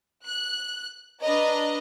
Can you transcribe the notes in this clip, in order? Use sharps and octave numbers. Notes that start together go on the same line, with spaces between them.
F#6
D4 B4 D#5 A#5